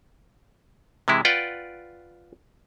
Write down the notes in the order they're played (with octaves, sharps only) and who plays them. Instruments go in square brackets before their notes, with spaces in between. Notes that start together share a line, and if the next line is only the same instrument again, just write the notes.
[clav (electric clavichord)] C3 E3 G#3 E4
F4 B4 D5 F#5 G5